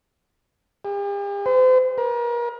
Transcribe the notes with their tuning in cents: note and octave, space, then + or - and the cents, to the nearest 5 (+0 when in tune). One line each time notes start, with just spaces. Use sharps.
G4 +45
C5 -40
A#4 +35